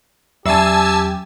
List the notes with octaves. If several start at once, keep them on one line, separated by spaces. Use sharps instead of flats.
E2 F#3 C#4 G4 E5 G#5 A5 E6